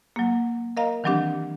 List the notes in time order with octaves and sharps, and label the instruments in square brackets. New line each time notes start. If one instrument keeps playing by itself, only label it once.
[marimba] F#3 A#3
A#4 D#5 F5 A#5
D#3 E3 F#3 C4 D4 G4